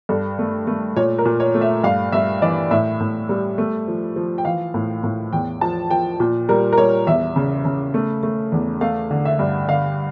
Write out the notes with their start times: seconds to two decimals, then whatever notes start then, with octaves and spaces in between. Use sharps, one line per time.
0.09 G2 A4
0.39 A3
0.67 A3
0.96 A#2 C#5
1.18 A#4
1.25 A#2
1.40 C#5
1.54 A3
1.61 E5
1.84 G2 F5
2.12 G2 E5
2.42 E3 D5
2.71 A2 E5
3.00 A2
3.29 G3
3.58 A3
3.88 F3
4.16 F3
4.38 G5
4.45 E3 F5
4.74 A2
5.03 A2
5.32 E2 G5
5.61 F3 A5
5.91 F3 G5
6.20 A#2
6.49 G3 A#4
6.73 A#4
6.78 G3 C#5
7.07 E2 E5
7.36 C#3
7.65 C#3
7.94 A3
8.23 A3
8.52 E2
8.81 A3 F5
9.11 D3
9.25 E5
9.39 G2
9.69 D3 F5